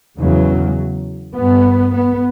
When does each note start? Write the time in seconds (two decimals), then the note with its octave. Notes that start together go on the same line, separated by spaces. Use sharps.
0.19 E2 C#3 F#3
1.36 G2 B3
1.93 B3